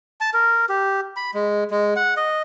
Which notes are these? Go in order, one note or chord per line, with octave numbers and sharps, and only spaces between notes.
A5
A#4
G4
B5
G#3
G#3
F#5
D#5